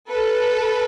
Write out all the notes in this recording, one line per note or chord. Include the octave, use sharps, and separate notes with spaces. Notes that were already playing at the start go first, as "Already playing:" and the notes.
A4 B4